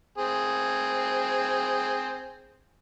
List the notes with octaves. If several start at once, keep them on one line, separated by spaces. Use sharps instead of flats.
C4 G#4